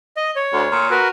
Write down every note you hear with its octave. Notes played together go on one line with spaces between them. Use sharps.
D#5
C#5
D2
A#2
F#4 A#4 B4